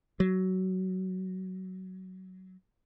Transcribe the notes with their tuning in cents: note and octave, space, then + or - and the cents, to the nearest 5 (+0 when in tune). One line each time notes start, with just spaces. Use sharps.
F#3 +15